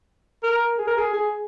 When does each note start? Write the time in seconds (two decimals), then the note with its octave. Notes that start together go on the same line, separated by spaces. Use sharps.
0.43 A#4
0.79 G#4
0.87 A#4
0.97 G#4
1.14 G#4